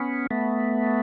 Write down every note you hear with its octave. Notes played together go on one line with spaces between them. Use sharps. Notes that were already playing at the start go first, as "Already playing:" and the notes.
Already playing: B3 C#4
A3 B3